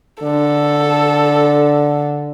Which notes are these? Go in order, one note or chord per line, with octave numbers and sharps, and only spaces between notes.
D3 A4